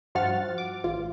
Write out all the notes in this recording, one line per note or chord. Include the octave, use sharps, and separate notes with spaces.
G2 F3 F#4 F#5 F6 A6
D6
A1 F4